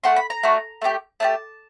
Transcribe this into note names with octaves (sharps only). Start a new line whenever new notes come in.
A3 D4 F#4 C6
B5
A#5
A3 D4 F#4
A3 D4 G4
A3 D4 G4 A5